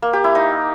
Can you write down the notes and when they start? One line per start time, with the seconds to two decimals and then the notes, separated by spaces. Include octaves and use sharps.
0.02 A#3
0.13 G4
0.24 E4
0.35 D#4